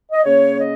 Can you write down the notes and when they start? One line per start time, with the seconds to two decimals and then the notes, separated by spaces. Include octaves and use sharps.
0.12 D#5
0.24 C#3 A#3 C#4 C#5
0.59 D#5